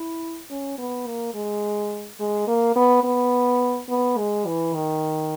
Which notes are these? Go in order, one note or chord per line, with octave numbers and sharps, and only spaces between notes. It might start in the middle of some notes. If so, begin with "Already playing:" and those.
Already playing: E4
C#4
B3
A#3
G#3
G#3
A#3
B3
B3
B3
G#3
E3
D#3